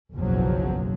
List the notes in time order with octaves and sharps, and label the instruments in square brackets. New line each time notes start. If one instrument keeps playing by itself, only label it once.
[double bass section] F#1 B1 E2 B2 F3 F#3